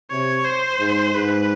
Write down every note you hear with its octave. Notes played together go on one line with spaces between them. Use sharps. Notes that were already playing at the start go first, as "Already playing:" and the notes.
C3 C#5
C5
G#2
G#2 B4